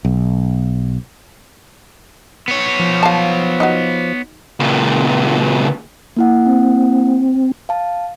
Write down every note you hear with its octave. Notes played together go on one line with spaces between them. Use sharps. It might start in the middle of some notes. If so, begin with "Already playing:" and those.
B1
B3 C#5
F3
F5 A5
D#4 F4 F#4
C#2 A#2
A#3 E4 F#5
C4
F5 A5